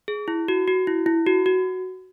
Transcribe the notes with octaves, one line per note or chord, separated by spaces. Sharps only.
G#4
E4
F#4
F#4
E4
E4
F#4
F#4